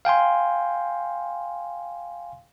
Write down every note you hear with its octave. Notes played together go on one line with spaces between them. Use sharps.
F5 G5 G#5 C6